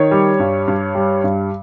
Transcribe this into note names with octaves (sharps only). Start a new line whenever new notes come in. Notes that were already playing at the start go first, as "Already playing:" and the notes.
Already playing: D#3 C#5
G3
G2
G2
G3
G2